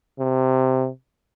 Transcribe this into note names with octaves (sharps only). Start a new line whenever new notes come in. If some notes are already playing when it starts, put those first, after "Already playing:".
C3